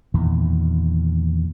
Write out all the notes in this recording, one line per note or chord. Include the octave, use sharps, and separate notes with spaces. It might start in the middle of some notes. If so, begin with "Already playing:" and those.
E2 A#2 D#3